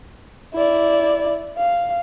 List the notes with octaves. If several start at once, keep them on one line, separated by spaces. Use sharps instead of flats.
E4 D5
F5